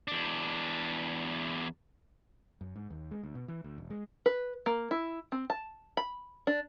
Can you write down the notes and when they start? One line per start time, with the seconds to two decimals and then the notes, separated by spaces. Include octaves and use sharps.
0.08 E2 D4
2.61 F#2
2.76 G#2
2.90 D#2
3.11 G#3
3.23 D2
3.35 B2
3.48 E3
3.64 D2
3.78 E1
3.90 G#3
4.26 B4
4.66 A#3
4.91 E4
5.32 C4
5.50 A5
5.97 B5
6.47 D4